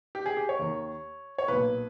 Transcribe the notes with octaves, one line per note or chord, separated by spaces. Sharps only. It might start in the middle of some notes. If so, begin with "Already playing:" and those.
G4
G#4
G4
C#5
D#2 D#3
C#5
B1 A#2 B4